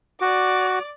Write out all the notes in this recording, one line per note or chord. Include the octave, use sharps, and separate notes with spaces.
F#4 D5 D6